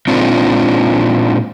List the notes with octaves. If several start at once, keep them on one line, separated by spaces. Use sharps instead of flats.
A#2 G#3 C4 D4 D#4 F4